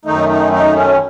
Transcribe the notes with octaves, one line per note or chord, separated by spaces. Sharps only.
F#2 D#3 A3 D#4
D#4
D#4
C#4